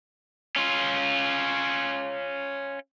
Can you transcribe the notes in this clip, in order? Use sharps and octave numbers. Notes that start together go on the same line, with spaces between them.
C#4 F4